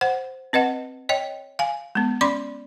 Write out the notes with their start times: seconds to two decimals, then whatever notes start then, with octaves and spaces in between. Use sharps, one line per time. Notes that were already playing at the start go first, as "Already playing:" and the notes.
0.01 C5 F#5
0.53 C4 B4 D#5 F#5
1.09 C#5 D#5 G5
1.59 F5 G#5
1.95 G#3 B3
2.21 C#4 D5 B5 C6 D6